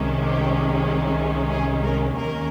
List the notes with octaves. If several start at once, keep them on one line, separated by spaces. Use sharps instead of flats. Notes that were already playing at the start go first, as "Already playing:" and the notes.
Already playing: C2 C3 D#3 G#3 C#4
G4
G#4
A#4
D#2 D#3 A#3 C#4 A#4